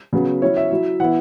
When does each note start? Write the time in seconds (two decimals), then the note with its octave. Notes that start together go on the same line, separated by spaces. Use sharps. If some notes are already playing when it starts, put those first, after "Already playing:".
0.13 C#3 F#3 B3
0.42 F#3 C#4 E4 C#5
0.57 E5
0.71 F#3 E4
1.00 E3 B3 E4 F#5